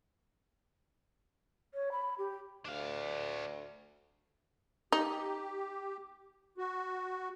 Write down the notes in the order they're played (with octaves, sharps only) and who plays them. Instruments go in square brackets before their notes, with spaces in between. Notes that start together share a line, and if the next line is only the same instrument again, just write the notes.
[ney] C#5
B5
G4
[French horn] D2 [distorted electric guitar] D4 F5
[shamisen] D#4 [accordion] G4
[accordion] F#4